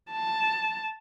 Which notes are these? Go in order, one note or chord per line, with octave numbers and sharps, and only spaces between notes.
A5